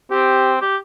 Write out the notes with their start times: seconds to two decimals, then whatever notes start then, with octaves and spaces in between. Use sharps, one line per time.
0.11 C4 G4
0.61 G4